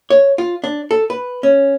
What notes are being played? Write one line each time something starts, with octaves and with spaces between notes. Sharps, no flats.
C#5
F4
D4
A4
B4
C#4